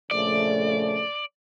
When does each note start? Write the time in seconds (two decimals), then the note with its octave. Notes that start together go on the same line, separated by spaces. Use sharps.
0.11 A#1 C#3 A3 D5